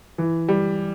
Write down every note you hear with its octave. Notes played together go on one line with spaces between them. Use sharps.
E3
G3